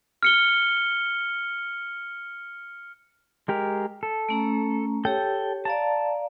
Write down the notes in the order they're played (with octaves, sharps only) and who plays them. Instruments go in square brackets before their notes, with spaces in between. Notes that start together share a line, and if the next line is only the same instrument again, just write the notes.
[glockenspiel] F6 C#7 G7
[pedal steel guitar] G#3 G4 A#4
A4
[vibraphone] A3 C#4 A#5
[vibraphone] G4 C#5 [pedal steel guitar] A4 G5
[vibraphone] D5 F5 A#5 [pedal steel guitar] A5